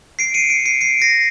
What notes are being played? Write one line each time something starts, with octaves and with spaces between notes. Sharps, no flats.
C7 D7
C#7 D#7
C7 D7
C7 D7
C7 D7
A#6 C7